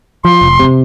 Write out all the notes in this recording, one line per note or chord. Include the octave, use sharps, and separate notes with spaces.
F3 C6
F1
C3